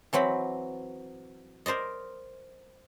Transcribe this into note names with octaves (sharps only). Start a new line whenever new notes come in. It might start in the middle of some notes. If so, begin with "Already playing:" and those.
E3 F#3 C4 B5
A#4 C5 D5 D#5